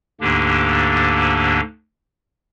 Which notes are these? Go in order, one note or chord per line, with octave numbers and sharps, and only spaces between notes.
D2 G#2 D3 A#3 D4 G4